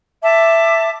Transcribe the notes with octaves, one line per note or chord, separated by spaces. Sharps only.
E5 A5 D6